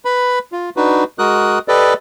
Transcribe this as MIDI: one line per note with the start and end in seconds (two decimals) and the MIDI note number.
0.05 0.39 71
0.05 0.39 83
0.52 0.70 65
0.76 1.04 62
0.76 1.04 63
0.76 1.04 66
0.76 1.04 71
1.19 1.59 56
1.19 1.59 66
1.19 1.59 70
1.19 1.59 87
1.19 1.59 90
1.68 1.94 67
1.68 1.94 69
1.68 1.94 71
1.68 1.94 74
1.68 1.94 75